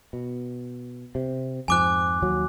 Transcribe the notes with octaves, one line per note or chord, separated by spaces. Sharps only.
B2
C3
F2 G#2 F3 G#5 D6 F#6
D#2 F#3